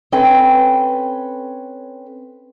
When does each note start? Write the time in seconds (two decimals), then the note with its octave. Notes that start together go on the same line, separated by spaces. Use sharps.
0.12 C4 C#4 A4 B4 G5